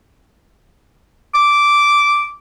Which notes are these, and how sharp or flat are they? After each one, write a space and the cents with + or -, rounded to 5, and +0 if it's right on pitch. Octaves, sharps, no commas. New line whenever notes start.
D6 -10